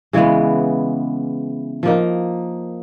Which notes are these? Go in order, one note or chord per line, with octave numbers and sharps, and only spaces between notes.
C#3 E3 G#3 B3
F3 A#3 D#4